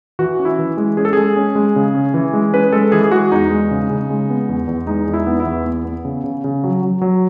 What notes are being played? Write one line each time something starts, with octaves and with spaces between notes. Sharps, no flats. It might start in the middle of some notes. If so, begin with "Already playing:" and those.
E3 F#4
C#4
E4
E3
G#3
C#4 G#4
A4
G#3 G#4
C#4
G#3
C#3
C#4
E3
G#3
C#4 B4
G#3 A4
E3 G#4
G#4
G#3 F#4
E2 D#4
G#3
C#3
C#3
G#3
B3
E2
E2
G#3 D#4
E2
E4
B3
E4
E2
B3
B3
C#3
C#3
C#3
F#3
F#3
F#3